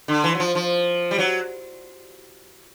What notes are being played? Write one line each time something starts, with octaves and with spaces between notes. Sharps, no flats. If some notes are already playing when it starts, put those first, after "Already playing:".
D3
E3
F#3
F3
F3
G3
F#3